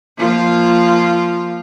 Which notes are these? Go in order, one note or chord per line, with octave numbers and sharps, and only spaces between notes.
F3 A#3 F4